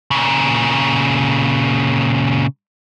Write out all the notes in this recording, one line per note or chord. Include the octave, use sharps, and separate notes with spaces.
A#2 C#3